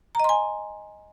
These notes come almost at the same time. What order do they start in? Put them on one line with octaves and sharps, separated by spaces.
A#5 D#5 C6 G#5